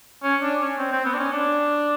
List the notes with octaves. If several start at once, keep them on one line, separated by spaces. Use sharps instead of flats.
C#4
D4
C#4
C4
C4
B3
D4
C#4
D4